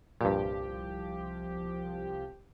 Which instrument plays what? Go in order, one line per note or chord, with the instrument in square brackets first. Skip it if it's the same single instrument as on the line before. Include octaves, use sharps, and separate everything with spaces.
[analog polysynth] C2 F3 G4 [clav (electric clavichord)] G2 A#2